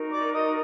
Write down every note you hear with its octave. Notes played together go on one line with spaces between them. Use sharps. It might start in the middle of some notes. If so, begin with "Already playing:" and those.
Already playing: D#4 F#4 A#4
D5 D6
D#5 D#6